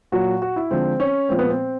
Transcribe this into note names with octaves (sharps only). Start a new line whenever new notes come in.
A#2 F#3 F#4
F#4
E4
D3 F3 G#3 C4
C#4
A#2 F3 G#3 C4
B3
C4